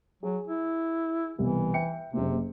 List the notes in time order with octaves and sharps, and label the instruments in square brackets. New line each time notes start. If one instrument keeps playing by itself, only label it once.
[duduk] F#3 [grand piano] G#4
[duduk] E4
[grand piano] C2 B2 [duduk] E3
[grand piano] E5 G5 C#7
[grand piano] F#1 A#3 [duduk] C3